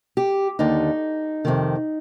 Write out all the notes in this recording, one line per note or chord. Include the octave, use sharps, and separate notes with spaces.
G4
D#2 D3 D#4
F2 C3 D#3